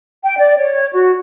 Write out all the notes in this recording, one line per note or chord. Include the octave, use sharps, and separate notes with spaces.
G5
D5
C#5
F#4